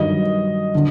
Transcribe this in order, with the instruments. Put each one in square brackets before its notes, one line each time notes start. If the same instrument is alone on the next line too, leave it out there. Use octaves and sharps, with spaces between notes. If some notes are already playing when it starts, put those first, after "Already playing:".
Already playing: [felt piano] G2 D#3 F#3 D#5
D3